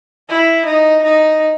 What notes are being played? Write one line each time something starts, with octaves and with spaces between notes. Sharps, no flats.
E4
D#4
D#4